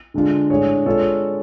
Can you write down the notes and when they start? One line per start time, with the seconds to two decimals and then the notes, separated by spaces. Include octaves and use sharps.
0.14 D3 G#3 D4 F4
0.50 A2 G#3 D4 G#4 C#5
0.86 G#3 D4 F4 A4 C#5